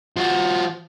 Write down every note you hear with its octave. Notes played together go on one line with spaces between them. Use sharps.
F3 F#4